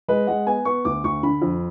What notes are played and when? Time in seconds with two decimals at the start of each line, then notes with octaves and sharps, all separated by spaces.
0.08 G#3 B4
0.27 G#3 F#5
0.46 B3 G#5
0.65 B3 C#6
0.85 D2 D6
1.04 D2 C#6
1.23 D3 B5
1.42 F2